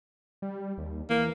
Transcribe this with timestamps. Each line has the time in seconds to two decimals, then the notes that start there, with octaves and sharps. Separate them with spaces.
0.42 G3
0.78 D#2
1.10 E3 A#3